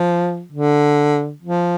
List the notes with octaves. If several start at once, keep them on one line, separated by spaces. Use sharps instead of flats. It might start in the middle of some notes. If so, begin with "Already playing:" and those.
Already playing: F3
D3
F3